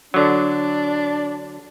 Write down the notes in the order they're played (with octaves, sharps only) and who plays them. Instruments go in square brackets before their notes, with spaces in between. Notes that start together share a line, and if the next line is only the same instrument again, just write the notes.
[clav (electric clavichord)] D3 F#3 [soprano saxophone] D4